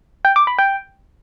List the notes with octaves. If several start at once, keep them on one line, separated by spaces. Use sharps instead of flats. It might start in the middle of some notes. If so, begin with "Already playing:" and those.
G5
D6
B5
G5